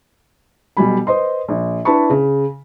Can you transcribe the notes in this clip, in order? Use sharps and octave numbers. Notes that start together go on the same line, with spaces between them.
B1 B2 G3 G#5 B5
B4 C5 D#5 C6
A#1
D4 E4 B4 A5 B5 C#6
C#3